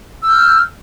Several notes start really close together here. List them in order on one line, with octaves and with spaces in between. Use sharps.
E6 G6 F6